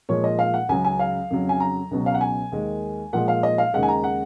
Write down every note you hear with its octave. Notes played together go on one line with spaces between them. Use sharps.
A#2 F3 G#3 C#5
D#5
F5
F#5
C#2 C#3 F#3 G#5
G#5
F5
F2 C#3 F#3
G#5
A#5
C#2 B2 F#3
F5
F#5
G#5
D#2 D#3 G#3
A#2 F3 G#3 F#5
F5
D#5
F5
D#2 C#3 G#3 F#5
G#5
A#5
F#5